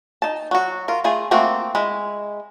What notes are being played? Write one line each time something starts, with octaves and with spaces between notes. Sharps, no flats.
D#4 A5
F#3 F#4
F4 A#4
A3 F4 G#4
A3 A#3 C4 F#4
G#3 E4